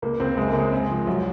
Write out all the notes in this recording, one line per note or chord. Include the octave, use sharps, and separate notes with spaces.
C#2 A#3
C#2 C4
F#2 G#3
A#3
C#3
G#3
C4
F3
C2 F#3